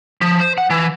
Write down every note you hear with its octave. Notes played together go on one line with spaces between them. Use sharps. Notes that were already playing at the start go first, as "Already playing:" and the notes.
F3
C5
F#5
E3